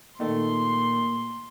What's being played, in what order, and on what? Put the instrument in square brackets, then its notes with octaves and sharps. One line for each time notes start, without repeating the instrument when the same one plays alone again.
[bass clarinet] A#2 [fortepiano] D#3 A3 D#4 [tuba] A#3 [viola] C6